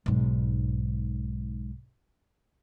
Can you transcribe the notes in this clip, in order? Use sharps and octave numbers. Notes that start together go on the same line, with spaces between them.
B1 G#2